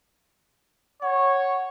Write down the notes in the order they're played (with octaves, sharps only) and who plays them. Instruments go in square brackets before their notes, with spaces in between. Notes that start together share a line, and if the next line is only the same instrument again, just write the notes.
[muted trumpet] C#5 [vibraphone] F#5